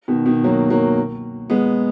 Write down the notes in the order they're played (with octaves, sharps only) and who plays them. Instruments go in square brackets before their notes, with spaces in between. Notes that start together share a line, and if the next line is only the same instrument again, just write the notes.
[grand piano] B2 D#3
B2 D#3
F#3 A#3
F#3 A#3
G#3 B3